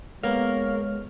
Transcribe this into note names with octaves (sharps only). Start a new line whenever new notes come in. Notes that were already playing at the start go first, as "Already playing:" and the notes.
G#3 A#3 B3 C#5 F6